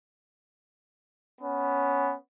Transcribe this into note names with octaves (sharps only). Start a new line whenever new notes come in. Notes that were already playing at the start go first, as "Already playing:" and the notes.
B3 C#4